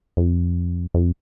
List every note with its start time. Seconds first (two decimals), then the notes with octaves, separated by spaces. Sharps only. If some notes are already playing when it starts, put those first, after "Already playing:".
0.17 F2
0.94 F2